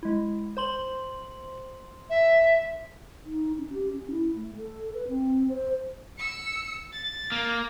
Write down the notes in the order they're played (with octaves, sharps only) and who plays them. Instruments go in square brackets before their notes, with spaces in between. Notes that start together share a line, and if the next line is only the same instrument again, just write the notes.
[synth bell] G#3 E4
C5 C6 F#7
[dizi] E5
[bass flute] D#4
C#4
G4
C#4
E4
A3
A4
B4
C4
C5
[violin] E6 C#7
A6
[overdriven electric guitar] A#3